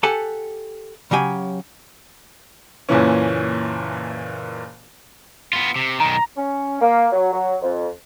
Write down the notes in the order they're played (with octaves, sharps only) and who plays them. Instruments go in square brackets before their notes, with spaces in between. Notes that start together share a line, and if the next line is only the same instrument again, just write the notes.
[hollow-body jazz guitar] G4 A4 F#5 G#5 A5
C#3 F#3 G4 G#5
[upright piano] F#1 A#2 E3 C#4
[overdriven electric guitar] B3 F4
C3
[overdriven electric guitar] B1 D#3 [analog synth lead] A#5
[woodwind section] C#4
A#3
F#3
F#3
F2